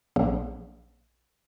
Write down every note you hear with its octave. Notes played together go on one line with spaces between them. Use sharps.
A#1